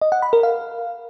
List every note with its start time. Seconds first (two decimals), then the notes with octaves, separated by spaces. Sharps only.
0.01 D#5
0.12 F#5
0.22 B5
0.33 A#4
0.43 F5